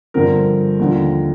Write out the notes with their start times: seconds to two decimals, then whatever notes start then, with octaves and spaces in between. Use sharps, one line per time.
0.14 G2 D3 F3 C4 A#4
0.79 D#2 D3 F3